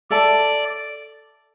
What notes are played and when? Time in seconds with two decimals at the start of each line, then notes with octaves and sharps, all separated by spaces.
0.11 A4 D5 E5 A5